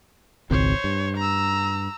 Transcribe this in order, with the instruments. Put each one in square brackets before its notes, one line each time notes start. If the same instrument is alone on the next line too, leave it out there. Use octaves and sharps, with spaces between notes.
[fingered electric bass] G#1 C#2 C4 [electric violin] C5 C#5
[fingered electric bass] G2
[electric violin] A#5 E6